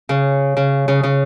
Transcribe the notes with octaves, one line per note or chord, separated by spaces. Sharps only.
C#3
C#3
C#3
C#3